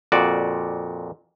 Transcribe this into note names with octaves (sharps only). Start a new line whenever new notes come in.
F2 A#2 F#4 D5